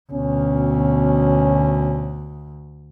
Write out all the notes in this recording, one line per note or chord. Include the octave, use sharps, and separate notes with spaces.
D2 B2 C#4